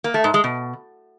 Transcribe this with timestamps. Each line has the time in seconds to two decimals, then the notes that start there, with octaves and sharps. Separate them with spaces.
0.04 A#3
0.14 A3
0.24 G#2
0.34 G#3
0.44 B2